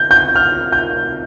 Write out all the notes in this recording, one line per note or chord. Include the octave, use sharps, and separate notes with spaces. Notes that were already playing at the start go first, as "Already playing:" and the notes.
Already playing: G6
G6
F6
G6